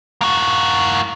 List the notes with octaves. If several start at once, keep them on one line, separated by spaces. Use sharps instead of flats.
A#3 F#4